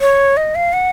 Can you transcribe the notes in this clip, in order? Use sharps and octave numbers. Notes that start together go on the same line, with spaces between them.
C#5
D#5
F5
F#5